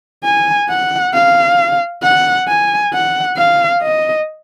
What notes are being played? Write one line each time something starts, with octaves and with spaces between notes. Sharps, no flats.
G#5
F#5
F5
F#5
G#5
F#5
F5
D#5